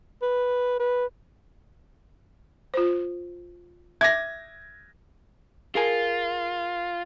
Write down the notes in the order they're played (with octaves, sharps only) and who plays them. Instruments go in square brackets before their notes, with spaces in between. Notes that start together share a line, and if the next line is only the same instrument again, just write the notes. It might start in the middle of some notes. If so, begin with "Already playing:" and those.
[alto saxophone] B4
B4
[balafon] F4 C5
[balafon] E5 D6 [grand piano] G#6 A#6
[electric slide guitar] F4 [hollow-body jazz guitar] G#4 A#4 G#5